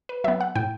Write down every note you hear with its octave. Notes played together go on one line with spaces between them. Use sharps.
B4
F#3 B3 E5
F#5
A2 G5